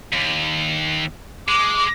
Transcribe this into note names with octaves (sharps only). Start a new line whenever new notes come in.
D#2
G#3 D6